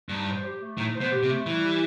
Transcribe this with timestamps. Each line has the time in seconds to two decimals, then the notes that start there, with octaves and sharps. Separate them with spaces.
0.09 G2 D#4
0.26 C5
0.43 G4
0.61 A3
0.78 A2 D#4
0.94 C5
1.01 B2
1.12 G4
1.23 C3
1.29 A3
1.46 E3 G3
1.63 G4